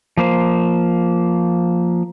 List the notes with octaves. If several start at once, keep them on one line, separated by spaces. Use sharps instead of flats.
F3 A#3 C5